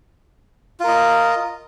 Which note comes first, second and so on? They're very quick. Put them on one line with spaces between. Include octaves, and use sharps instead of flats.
F4 A#4 D#5